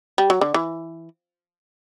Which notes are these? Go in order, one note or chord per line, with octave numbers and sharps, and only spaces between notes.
G3
F#3
D3
E3